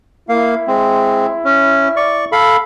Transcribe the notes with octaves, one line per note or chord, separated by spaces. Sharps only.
A#3 E4 F5
G#3 C4
C#4
D5 C#6
A4 F5 B5